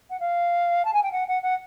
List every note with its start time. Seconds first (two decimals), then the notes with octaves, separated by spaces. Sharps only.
0.10 F#5
0.20 F5
0.85 A5
0.93 G#5
1.03 G5
1.12 F#5
1.28 F#5
1.43 F#5